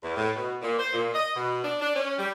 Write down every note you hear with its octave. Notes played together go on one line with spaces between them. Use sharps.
E2
A2
B2
A#2
C5
A#2
D#5
B2
D4
D4
C#4
G3